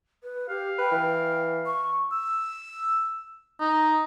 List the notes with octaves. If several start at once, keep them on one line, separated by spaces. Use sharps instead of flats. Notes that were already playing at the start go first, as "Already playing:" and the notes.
B4
G4 F5
B4 G5
E3
C#6
E6
D#4